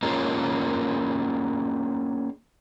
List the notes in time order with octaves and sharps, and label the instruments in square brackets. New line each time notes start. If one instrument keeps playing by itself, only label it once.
[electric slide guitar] A#3 C#4 D4 F4 G#4 A#4